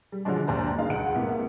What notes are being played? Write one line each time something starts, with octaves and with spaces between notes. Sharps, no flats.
G3
D3 F3 F#3 G#3 D4
G1 D#2 D4 C5 A#5
G#3 D#4 F5
C#2 F#5 D7
G#2 C3 A#3 B3 E4